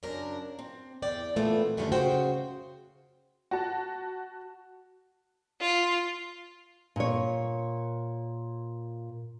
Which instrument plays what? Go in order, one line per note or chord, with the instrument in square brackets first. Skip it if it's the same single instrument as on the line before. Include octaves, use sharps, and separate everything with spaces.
[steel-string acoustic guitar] F#2 C#3 D4 A#4 A#5
C4
E2 D5 G5
A#2 E3 A3 B3 C4
F#2 D3 D#3 G3 A3 D4
C#3 F#4 C5 G5
[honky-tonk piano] F#4 A5
[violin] F4
[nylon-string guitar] A#2 C#5